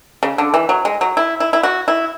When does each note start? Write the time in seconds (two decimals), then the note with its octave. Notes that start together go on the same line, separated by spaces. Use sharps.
0.23 C#3
0.38 D3
0.54 E3
0.69 F#3
0.85 G#3
1.01 F#3
1.17 E4
1.40 E4
1.53 E4
1.63 F#4
1.88 E4